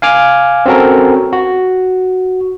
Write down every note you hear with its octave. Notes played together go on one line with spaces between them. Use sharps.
F5 G#5 D6 F6
C4 C#4 F#4 A4 A#4
F#4